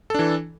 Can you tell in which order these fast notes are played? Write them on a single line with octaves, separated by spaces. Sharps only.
A4 D4 E3